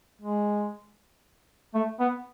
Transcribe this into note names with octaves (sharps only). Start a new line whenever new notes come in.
G#3
A3
B3